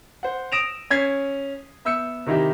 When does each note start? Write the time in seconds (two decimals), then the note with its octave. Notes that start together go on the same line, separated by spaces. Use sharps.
0.23 C5 F#5
0.52 D#6 A#6 D7 E7 F7
0.90 C#4 G#6 B6 C7
1.85 B3 E5 E6 G6 C#7
2.26 C3 D#3 D#4 E4 G4